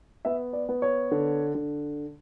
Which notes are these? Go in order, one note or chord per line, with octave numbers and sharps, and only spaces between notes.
B3 E5
D5
B3
C#5
D3
D3